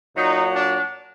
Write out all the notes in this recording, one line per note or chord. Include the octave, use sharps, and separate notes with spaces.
A#2 F#3 D#4
D4